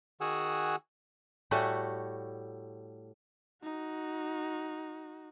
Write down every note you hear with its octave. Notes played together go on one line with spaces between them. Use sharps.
D#3 F#4 G#4 F#5 G#5 E6
A2 G3 A3 F#4 G#5
D#4 F#4